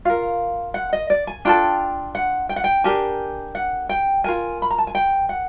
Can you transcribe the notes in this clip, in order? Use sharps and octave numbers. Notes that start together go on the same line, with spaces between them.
F4 A#4 F5
F#5
D#5
D5
G#5
D4 F4 A4 G5
F#5
G5
F#5
G5
D4 G4 A#4 G#5
F#5
G5
F4 A#4 G#5
B5
A#5
A5
G#5
G5
F#5